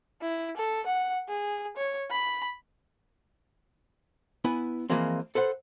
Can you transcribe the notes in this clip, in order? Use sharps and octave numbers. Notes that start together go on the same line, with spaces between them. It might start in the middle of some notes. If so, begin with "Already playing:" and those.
E4
A4
F#5
G#4
C#5
B5
B3 E4 B4 G#5
E3 F3 G#3 A#3 C4
A4 B4 C5 F#5